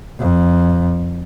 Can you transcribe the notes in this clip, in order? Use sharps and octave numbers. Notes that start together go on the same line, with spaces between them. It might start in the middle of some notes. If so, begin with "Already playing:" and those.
F2